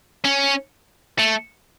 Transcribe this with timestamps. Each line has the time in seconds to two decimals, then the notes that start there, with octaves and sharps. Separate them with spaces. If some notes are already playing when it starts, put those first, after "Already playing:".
0.24 C#4
1.19 A3